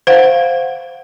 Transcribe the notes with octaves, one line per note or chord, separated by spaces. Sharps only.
C5 F5 F#5